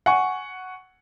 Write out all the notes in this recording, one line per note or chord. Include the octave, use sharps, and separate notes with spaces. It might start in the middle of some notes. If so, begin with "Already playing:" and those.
F#5 G#5 C#6